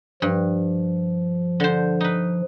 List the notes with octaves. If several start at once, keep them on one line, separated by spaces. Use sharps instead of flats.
G2 F3
D3 C5
D#4 B4